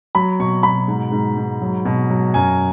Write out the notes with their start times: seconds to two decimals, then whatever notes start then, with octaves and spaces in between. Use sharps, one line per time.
0.15 F#3 B5
0.39 B2 C#6
0.63 B2 B5
0.88 G#2
1.12 G#2
1.36 G#2
1.61 F#3
1.85 B2
2.10 F#3
2.34 F#2 G#5